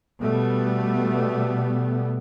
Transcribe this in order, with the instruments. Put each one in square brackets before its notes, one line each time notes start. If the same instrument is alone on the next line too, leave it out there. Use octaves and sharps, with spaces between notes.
[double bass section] B2 G3 A3 B3